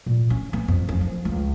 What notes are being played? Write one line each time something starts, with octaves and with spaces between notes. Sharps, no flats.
A#2
C#4
B3
F2
C#4
F3
C#2